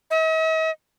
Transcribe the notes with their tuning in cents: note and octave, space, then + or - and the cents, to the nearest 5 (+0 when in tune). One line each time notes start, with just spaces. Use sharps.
D#5 +45